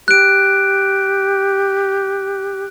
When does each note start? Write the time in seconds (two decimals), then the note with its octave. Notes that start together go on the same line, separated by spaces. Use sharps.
0.08 G4 F#6 D7